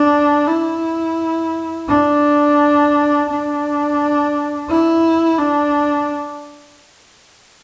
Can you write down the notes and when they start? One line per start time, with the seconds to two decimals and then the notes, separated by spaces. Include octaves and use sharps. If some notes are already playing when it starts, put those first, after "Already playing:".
Already playing: D4
0.47 E4
1.88 D4
3.29 D4
4.69 E4
5.39 D4